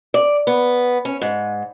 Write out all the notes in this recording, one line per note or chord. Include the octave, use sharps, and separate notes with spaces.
D5
B3
C#4
G#2